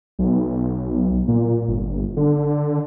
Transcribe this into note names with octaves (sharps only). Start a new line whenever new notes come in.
B1
A#2
G1
D3